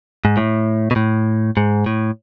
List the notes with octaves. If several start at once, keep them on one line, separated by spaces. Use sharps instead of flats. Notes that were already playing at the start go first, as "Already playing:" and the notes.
G#2
A2
B2
A2
G#2
A2